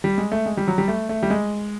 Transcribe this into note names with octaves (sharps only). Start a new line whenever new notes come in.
G3
G#3
A3
G#3
G3
F#3
G3
A3
A3
G3
G#3